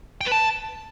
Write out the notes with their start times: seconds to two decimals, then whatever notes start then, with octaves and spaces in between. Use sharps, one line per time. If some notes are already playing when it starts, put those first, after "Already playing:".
0.21 G5
0.26 B4
0.32 A5